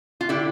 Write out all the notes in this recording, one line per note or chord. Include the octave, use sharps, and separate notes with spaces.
F4
D3 E4 G4